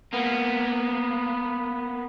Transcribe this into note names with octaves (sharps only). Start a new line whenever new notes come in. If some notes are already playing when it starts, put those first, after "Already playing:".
A#3 B3